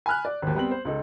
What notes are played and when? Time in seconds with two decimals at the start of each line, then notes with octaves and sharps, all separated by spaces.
0.06 G#5 B5 F6 F#6
0.25 D5
0.42 G#1 D#2
0.55 G3 B3 C4 F#7
0.71 C5
0.85 C#2 D#4 A4